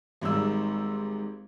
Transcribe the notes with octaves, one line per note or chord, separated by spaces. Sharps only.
G#1 G#2 G3 E6